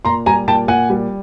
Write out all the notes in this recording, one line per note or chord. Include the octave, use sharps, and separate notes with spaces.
A#2 A#5 C6
G3 G#5 A#5
A#2 G5 A5
A#2 F#5 G#5
G3